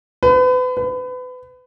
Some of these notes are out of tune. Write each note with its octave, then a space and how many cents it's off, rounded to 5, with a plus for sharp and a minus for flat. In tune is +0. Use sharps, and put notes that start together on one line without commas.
B4 +35
B4 +30